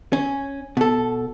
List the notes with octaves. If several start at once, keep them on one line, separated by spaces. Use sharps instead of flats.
C#4
B2 A4